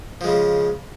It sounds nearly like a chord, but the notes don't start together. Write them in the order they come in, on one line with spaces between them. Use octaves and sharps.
F3 G#3 C#3